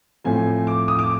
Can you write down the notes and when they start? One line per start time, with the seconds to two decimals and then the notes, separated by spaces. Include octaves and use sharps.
0.24 A2 F3 A3 C4 G#5
0.67 D6
0.88 D#6
0.99 D6